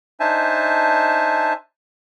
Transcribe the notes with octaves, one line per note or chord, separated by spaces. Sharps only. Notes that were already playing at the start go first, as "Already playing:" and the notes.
D4 D#4 C5 E5 G#5 A5